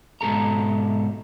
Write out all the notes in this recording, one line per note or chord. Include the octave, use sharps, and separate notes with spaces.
G#2 B2 A4 A#5